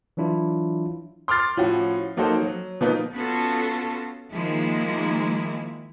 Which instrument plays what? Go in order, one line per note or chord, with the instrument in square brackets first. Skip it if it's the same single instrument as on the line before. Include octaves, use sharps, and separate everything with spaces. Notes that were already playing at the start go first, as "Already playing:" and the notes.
[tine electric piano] E3 F#3 D4 E4 F4
[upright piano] C6 D6 F6 A6 C7
A2 F3 C#4 F4 F#4
F#3 A#3 D#4 F#4 A4 C5
F#3
B2 F3 A#3 B3 D#4
[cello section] B3 C#4 F4 F#4 A4
D#3 F3 G#3 A#3 E4